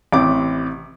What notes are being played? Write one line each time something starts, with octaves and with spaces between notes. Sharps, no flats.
A1 C3 E4 D6